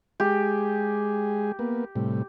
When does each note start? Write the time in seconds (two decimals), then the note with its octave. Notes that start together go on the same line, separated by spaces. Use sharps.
0.20 G#3 G4 G#4
1.59 A#3 B3
1.96 A2 C3 G3